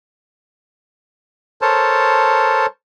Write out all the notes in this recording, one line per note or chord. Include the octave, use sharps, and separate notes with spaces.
A4 A#4 C5 C#5 A5